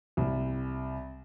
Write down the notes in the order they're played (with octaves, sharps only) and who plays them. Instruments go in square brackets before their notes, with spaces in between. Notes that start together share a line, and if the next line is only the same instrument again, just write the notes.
[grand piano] C2